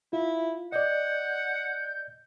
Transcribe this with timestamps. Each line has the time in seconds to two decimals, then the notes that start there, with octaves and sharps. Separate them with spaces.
0.13 E4 F4
0.72 D5 D#5 F#5 G6